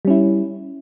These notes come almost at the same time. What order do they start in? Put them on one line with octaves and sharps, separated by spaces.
G3 C#4 E4